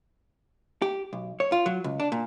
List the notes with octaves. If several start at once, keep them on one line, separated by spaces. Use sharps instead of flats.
G4
B1
C#5
F4
F#3
C#2
D4
A#2